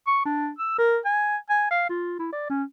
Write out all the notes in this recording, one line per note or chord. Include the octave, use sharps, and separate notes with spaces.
C#6
D4
E6
A#4
G#5
G#5
F5
F4
E4
D5
C#4